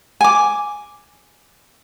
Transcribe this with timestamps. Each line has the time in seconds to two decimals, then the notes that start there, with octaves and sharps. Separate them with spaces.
0.21 G#5 D6